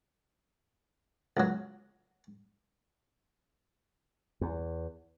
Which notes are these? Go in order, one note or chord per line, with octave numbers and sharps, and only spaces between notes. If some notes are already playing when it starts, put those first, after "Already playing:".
C#2 F#3
E2